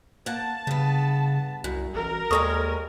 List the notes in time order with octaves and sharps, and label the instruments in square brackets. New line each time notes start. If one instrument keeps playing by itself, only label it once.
[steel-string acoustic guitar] A#3 F#5 [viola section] A5
[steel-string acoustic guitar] G2 B3 [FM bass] C#3
[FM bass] C2 [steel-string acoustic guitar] F#2
[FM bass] A1 [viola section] A#4
[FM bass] D#2 [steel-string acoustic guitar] G3 G#3 C#4 [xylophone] A4 C#6 D#6